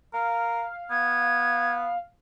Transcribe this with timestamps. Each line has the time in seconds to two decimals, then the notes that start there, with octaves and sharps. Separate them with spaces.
0.14 A#4 F5
0.91 B3 G#6